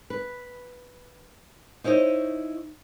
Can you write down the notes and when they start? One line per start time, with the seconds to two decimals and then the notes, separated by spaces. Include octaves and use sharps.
0.10 B4
1.84 D#4 E4 C5 C#5 D#5